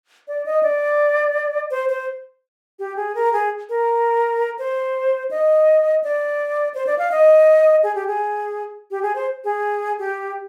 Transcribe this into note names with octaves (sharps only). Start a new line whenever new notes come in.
D5
D#5
D5
C5
C5
G4
G#4
A#4
G#4
A#4
C5
D#5
D5
C5
D5
F5
D#5
G#4
G4
G#4
G4
G#4
C5
G#4
G4